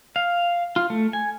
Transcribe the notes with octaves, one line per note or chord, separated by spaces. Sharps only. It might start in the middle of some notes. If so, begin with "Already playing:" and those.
F5
F4
A3
G#5